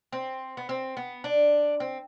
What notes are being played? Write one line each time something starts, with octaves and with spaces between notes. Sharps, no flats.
C4
B3
C4
B3
D4
C4